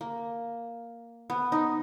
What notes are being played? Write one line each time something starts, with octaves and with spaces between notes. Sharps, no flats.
A#3
B3
D#4